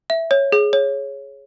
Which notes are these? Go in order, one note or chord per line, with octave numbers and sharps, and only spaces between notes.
E5
C#5
G#4
C#5